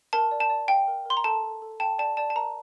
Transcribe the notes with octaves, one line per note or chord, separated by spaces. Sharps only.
A#4 A5
D5
A5
D5
F5 G5
A#4
A#4 C6
A#5
A4 A5
A4
A4
G5 A5
D5 A5
D5 A5
A5
A#4 A#5